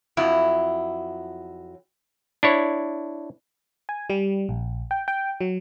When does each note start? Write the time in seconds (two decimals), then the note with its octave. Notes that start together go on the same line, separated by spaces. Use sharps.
0.17 F2 F#3 E4
2.43 D4 E4 C#5
3.89 G#5
4.10 G3
4.49 A#1
4.91 G5
5.08 G5
5.41 F#3